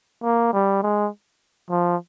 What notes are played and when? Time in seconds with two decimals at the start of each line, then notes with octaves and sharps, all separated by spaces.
0.23 A#3
0.53 G3
0.83 G#3
1.70 F3